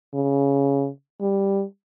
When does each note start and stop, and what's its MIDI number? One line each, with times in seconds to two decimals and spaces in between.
0.14 0.88 49
1.21 1.63 55